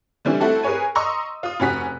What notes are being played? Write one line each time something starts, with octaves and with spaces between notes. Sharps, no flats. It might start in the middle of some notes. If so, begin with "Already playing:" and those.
D3 E3 G3 C4 C#4 E4
A3 C4 E4 F#4 A4
G#4 A#4 B4 C#5 G#5
D#5 A#5 C6 C#6 D#6 E6
F4 D#6
F1 C#4 F#4 B6